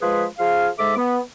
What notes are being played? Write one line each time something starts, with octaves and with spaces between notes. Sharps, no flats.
F3 G#3 G#4 B4
F3 G#4 F5
G#2 G#3 A4 E5 D6
B3